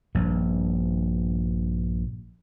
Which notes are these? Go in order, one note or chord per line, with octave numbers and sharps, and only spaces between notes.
A#1 G2